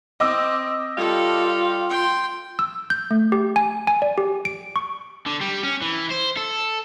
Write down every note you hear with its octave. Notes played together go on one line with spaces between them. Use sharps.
C4 D#5 D6 E6
G3 F4 G4 A4 F5
G5 C6
E6
G6
A3
G4
G#5
G#5
D5
G4
D7
C#6
D3
G3
C#4
E3
C5
A4